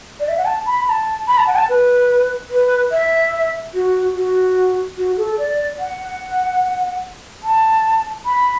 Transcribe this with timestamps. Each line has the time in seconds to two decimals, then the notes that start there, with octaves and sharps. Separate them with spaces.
0.20 D5
0.28 E5
0.38 F#5
0.45 A5
0.66 B5
0.86 B5
0.89 A5
1.28 B5
1.38 A5
1.47 F#5
1.56 A5
1.69 B4
2.51 B4
2.92 E5
3.74 F#4
4.15 F#4
4.98 F#4
5.17 A4
5.38 D5
5.80 F#5
7.43 A5
8.26 B5